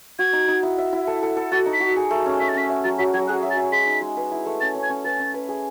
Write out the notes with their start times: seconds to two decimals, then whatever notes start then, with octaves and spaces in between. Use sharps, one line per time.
0.19 F#4 G#6
0.33 D#4
0.48 D#4
0.63 E4
0.78 E5
0.93 E4
1.07 A4
1.23 A4
1.37 A4
1.52 F#4 A6
1.66 D#4
1.73 B6
1.80 F#4
1.96 G#4
2.11 A3
2.26 C#4
2.40 E5 B6
2.49 A6
2.54 C#4 B6
2.70 E5
2.84 F#3 A6
2.98 F#3 B6
3.14 F#3 G#6
3.28 G#4 F#6
3.43 E5
3.50 A6
3.57 E5
3.72 G#3 B6
3.87 D#4
4.01 G#3
4.17 B4
4.32 E4
4.46 A3
4.61 C#4 A6
4.75 C#4
4.83 G#6
4.89 C#4
5.04 B4 A6
5.19 C#4
5.34 B4
5.49 G#4